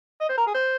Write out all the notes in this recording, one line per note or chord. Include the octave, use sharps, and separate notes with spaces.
D#5
C5
A#4
G#4
C5